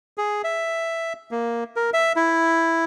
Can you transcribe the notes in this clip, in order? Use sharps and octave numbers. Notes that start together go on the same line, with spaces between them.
G#4
E5
A#3
A#4
E5
E4